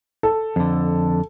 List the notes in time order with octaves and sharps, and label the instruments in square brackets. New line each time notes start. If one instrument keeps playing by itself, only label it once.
[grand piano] A4
[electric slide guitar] F2 D3